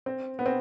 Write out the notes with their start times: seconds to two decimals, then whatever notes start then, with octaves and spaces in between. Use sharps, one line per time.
0.06 C4
0.39 B3
0.46 C4